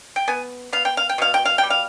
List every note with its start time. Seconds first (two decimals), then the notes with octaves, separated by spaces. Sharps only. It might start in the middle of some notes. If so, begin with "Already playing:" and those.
0.16 G5
0.28 B3 G#5
0.72 B3 F5
0.85 G5
0.97 F5
1.09 G5
1.18 B2 F5
1.34 G5
1.45 F5
1.58 G5
1.63 G3
1.70 F5